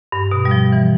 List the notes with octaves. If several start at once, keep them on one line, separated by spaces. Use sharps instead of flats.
G2
B2
G3
F3
E3